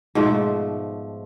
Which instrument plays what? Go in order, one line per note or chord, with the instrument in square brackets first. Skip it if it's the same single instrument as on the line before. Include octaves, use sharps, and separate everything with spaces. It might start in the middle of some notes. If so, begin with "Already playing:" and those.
[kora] G#2 B2 F3 A3